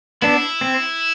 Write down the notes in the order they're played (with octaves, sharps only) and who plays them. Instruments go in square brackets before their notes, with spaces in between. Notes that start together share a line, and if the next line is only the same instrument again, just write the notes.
[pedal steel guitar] B3 D4 [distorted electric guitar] E4
[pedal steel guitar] C4